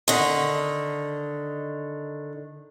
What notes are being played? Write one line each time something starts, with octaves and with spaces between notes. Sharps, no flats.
D3 D#3